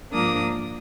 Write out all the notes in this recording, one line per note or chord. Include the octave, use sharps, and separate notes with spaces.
G#2 F3 A#3 D4 D#6